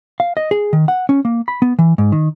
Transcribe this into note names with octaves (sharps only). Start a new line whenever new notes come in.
F5
D#5
G#4
D#3
F#5
C#4
A#3
B5
B3
E3
G#2
D#3